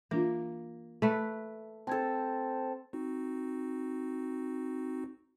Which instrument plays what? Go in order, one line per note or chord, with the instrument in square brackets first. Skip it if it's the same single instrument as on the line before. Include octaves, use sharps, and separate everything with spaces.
[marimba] E3 D4 F4 [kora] A#3
[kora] A3 B4
[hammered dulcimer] C4 A4 [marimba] A5 G#6
[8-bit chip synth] C4 D#4 F#4